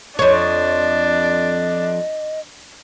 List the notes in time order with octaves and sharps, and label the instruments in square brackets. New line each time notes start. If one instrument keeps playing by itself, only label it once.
[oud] F2 C#5 [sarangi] D4 [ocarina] D#5